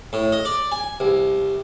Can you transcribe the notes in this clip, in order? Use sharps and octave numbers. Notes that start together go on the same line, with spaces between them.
A2
D#5
D5
G#5
C2